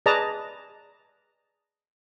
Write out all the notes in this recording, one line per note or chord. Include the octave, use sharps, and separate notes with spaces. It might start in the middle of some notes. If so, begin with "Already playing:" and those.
G#4 B4 D5 D#5 A5 A#5